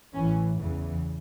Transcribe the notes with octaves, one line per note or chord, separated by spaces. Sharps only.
A1 A2 E3 C#4
E2 C#3 E3